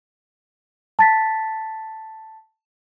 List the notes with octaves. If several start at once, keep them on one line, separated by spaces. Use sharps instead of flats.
A5 A6 B6